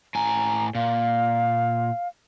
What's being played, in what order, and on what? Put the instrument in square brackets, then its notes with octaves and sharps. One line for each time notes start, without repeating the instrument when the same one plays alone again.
[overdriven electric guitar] A2 G#5 [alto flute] A#5
[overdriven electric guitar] A#2 [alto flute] F5